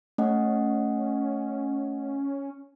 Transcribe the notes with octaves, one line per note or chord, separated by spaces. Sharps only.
A3 C#4 D#5 F#5